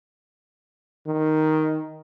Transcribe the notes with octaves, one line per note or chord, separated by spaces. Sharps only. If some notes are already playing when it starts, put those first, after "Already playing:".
D#3